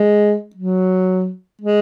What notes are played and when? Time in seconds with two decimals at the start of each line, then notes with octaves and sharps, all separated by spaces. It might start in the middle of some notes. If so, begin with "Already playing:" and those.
Already playing: G#3
0.56 F#3
1.62 G#3